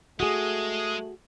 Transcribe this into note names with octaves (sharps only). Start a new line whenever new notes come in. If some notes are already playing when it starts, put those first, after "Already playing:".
G#3 A3 F#4 G#4 D#6